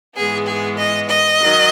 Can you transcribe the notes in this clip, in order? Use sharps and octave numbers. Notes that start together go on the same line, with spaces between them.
G#2 E3 G#3 B3 G#4
G#4
D#5
D#5
D#3 F#3